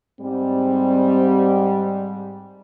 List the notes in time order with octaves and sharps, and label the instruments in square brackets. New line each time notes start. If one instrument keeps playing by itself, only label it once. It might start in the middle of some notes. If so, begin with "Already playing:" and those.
[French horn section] G#2 G3 [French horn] C4